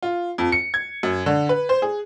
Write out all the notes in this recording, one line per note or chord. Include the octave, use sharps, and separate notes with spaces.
F4
F2
C#7
G#6
F#2
D3
B4
C5
G#4